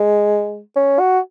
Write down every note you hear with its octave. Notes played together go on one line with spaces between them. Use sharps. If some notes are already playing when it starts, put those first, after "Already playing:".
Already playing: G#3
C#4
F#4